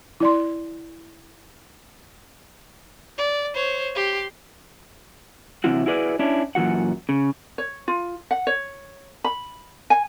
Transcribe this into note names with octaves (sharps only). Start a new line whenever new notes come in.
E4 D5 C6
D5
C5 C#5
G4 C6
C3 E3 F#3 C4 E4 F#4
E4 F#4 G#4 B4 D5
C#4 D4 E4
F#2 A#2 E3 F#4 F#5
C#3
C#5
F4
F#5
C#5
B5
G#5